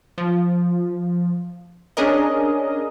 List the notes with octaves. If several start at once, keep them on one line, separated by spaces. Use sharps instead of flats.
F3
C#4 D4 G#4 A#4 D#5